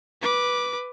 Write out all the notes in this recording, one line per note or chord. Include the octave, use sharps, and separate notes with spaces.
B4 D6